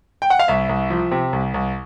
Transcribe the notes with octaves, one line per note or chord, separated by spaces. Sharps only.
G5
F#5
F5
C2 E5
C2
F3
C3
C2
C2